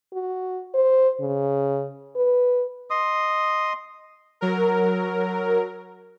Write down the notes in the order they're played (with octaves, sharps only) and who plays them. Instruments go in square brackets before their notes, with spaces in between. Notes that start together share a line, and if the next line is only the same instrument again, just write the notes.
[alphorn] F#4
C5
C#3
B4
[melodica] D#5 C6 D#6
[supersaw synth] F#3 A#4